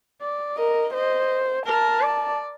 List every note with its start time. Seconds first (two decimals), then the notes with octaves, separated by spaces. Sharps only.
0.21 D5
0.57 A#4 D#5
0.94 C5 D#5
1.66 A#4 A5
2.02 D5